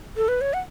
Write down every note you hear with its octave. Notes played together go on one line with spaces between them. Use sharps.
A4
B4
C#5
F#5